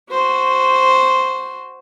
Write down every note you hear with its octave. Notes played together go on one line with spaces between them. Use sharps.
F#4 C5